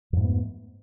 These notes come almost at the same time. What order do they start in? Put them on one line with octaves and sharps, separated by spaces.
F2 G#2 A3 B3